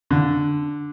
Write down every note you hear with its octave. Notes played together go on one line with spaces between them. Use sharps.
D3